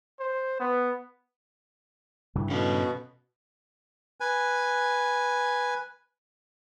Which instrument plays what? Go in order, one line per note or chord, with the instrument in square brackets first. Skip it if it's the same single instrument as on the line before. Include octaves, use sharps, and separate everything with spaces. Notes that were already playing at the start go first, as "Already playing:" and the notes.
[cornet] C5
B3
[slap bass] G2 C#3 E3
[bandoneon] B2 [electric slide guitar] C#4 A4
[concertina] B4 G#5